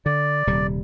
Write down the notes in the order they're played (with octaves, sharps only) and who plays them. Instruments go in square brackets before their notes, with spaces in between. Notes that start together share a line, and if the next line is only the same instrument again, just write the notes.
[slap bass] D3 [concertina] D5
[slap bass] D#1 C3 G3